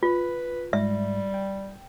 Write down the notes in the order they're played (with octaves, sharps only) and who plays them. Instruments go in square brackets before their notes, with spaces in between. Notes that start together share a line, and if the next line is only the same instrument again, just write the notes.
[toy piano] F4 [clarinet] B4
[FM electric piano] G#2 [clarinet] G3 [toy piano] E5
[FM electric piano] G5